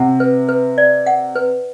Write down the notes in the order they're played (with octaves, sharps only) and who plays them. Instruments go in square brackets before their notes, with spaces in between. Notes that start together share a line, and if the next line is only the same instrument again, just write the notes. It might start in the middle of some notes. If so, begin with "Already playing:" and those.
Already playing: [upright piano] C3 [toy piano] F#5
[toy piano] B4
B4
D5
F#5
B4